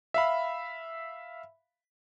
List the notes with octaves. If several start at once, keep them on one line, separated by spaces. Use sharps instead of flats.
E5 F5 B5